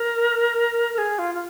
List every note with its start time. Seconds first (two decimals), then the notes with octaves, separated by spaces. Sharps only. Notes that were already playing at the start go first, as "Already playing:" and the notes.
Already playing: A#4
0.94 A#4
0.98 G#4
1.19 F4
1.35 F4